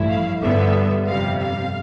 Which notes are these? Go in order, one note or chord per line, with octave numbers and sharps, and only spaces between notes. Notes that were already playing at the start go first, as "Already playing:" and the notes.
Already playing: A1 G2 F3 A3 E4
F5
G1 G2 D3 G3 B3 E5
G1 F2 C3 G3 F5
F5